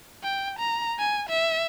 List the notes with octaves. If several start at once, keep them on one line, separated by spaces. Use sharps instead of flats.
G5
A#5
G#5
E5